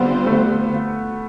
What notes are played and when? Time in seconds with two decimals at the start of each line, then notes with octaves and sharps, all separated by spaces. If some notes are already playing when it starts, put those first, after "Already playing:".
Already playing: D3 G3 B3 C4 F4 C5
0.27 A3